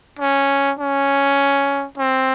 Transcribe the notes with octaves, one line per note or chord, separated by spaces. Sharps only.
C#4
C#4
C4